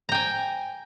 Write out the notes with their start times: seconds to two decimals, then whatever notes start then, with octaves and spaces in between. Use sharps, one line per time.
0.09 A#5
0.12 G5
0.14 G#5